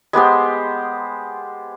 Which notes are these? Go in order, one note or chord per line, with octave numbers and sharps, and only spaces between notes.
G#3 B3 G4 C5